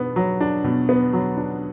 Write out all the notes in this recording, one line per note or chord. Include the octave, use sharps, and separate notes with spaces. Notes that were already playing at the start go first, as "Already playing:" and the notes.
Already playing: B2 B3 D4
F#3
D4
B2
B3
F#3
D4